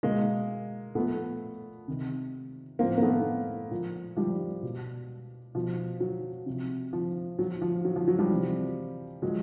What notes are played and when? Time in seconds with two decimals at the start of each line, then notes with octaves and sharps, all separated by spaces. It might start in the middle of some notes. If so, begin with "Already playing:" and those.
0.03 B2 G#3 A#3
0.95 A#2 F3 A3 B3
1.88 C3 D#3
2.79 A2 F3 A#3 C4
2.98 A#3
3.02 A3 B3
3.71 A#2 F3
4.16 F3 G3
4.63 B2
5.55 B2 F3
6.00 F#3
6.46 C3 F3
6.93 F3
7.39 A#2 F3 F#3
7.62 F3
7.85 F#3
7.96 F3
8.08 F#3
8.19 F3 G3
8.30 C3 E3
9.22 A#2 F3 F#3 G#3